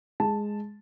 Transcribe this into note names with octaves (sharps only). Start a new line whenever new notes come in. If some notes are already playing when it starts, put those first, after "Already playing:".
G#3 A5